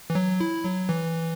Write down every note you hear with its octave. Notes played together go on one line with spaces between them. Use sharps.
E3
F#3
E4
F#3
E3